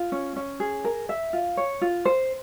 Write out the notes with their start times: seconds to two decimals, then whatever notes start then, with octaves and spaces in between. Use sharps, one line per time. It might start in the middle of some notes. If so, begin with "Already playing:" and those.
Already playing: F4
0.12 C#4
0.36 C#4
0.60 G#4
0.84 A#4
1.09 E5
1.33 F4
1.57 C#5
1.81 F4
2.05 C5